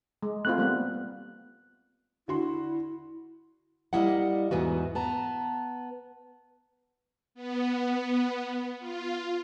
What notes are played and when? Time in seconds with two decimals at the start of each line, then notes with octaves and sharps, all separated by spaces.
0.23 G#3
0.45 A3 C4 F4 F#6
0.58 G3 A#3 B3
2.28 D3 E4 F#4 C6
3.93 G3 A#3 E4 D#5 F#5
4.51 E2 G#2 E3 B3 F#4
4.95 B3 A5 A#5
7.35 B3
8.79 F4